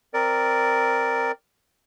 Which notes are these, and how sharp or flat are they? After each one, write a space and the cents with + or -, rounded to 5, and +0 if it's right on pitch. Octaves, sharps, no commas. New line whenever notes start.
C4 +0 A#4 +0 D5 +0